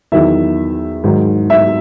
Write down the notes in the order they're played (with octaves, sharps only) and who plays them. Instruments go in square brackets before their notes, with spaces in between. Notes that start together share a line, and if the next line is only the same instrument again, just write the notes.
[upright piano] E2 D#3 F#3 E5
G#2 D#3 F#3
E5